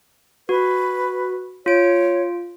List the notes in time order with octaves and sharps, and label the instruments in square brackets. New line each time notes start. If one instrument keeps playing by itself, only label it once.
[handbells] F#4 [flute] B4
[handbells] F4 D7 [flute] C#5